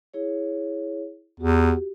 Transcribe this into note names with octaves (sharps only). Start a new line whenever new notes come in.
E4 G#4 C#5
E2 F#4 G4